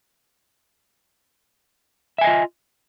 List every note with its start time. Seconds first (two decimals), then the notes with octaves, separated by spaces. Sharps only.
2.18 E5
2.21 G#5
2.24 D#5
2.27 F4